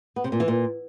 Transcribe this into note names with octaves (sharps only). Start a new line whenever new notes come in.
B3
C3
A#2
E3
A#2